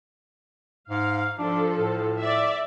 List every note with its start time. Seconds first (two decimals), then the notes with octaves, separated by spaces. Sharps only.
0.90 G#2 F5
1.39 F3 D4 A4
1.76 A2
2.19 D5 E5